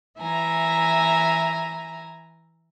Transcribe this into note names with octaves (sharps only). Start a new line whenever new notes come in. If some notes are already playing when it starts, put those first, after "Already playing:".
E3 E5 G#5 A#5